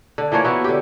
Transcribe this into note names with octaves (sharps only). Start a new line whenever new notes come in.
D3
E3 F3 A#3 C#5
B3 E4 F#4
D3 G4